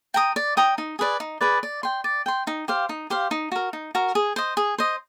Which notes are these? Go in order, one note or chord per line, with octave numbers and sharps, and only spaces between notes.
G5 A#5 D#6
D5
G5 A#5 D#6
D#4
G#4 B4 D5
D#4
G#4 B4 D5
D5
G5 C6
D5
G5 C6
D#4
G4 C5 F5
D#4
G4 C5 F5
D#4
F#4 A#4
D#4
F#4 A#4
G#4
C5 D#5
G#4
C5 D#5